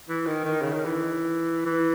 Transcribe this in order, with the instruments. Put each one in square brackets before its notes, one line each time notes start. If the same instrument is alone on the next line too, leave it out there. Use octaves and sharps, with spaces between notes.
[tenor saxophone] E3
D#3
D#3
C#3
D#3
E3
E3